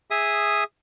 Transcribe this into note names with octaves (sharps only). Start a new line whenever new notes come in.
G#4 E5 D#6